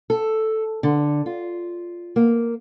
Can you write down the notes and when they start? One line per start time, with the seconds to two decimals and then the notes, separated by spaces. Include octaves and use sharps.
0.10 A4
0.83 D3
1.26 F4
2.16 A#3